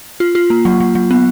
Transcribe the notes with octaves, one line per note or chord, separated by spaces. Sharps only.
F4
F4
A#3
F#3
F#3
F#3
B3